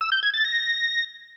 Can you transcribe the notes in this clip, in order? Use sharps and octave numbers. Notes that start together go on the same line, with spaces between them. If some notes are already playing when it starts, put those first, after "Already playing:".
E6
G6
G#6
A6
A#6